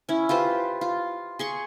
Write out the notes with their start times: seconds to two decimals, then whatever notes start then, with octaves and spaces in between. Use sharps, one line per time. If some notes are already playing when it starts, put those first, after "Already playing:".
0.09 C#4 E4
0.29 F4 G4 B4 C5
0.81 F4
1.39 G#4 C6 C#6